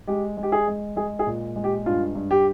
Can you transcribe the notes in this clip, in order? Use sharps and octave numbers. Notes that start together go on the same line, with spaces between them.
G#3 G4
G#3
G4
G#4
G#3
G#3 G#4
G#4
A#2
G#3
G4
G2 F4
G2
G4